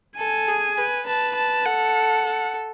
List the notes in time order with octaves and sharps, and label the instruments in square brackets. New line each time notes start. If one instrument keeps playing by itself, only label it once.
[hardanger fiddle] A4 [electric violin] G#5
[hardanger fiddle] G#4
B4
[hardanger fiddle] B4 [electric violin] A5
[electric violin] A5
[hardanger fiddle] A4 [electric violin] F#5
[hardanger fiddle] A4